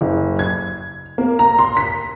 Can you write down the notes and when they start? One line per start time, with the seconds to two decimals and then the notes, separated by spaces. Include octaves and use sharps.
0.01 F#1
0.39 G#6
1.18 A#3
1.39 A#5
1.59 C6
1.77 B6